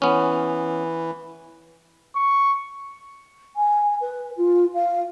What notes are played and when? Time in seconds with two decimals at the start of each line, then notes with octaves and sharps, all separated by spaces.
0.02 E3 B3 C#4
2.16 C#6
3.56 G#5
4.01 B4
4.37 F4
4.74 F5